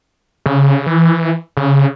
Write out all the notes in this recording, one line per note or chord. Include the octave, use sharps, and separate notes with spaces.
C#3
E3
C#3